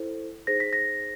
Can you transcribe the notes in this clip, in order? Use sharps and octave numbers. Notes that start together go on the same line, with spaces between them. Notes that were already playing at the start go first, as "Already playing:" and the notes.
Already playing: E4 A4 C5
D#4 G#4 C5 A#6
B6
A#6